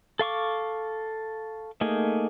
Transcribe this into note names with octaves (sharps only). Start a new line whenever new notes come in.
A4 F5 C#6 D6
A3 A#3 D#4 G#4